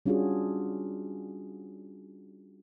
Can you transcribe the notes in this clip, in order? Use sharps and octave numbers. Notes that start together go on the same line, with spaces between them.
G3 C#4 D4 F4 F#4 G#4